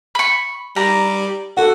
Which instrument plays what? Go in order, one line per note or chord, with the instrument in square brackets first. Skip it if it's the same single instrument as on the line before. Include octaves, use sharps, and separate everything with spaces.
[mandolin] B5 C#6
[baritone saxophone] G3 [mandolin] A#5
[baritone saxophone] F#4 [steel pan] A4 F#5